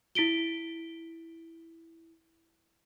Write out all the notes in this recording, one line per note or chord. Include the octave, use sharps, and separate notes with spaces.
E4 B6 D7 G7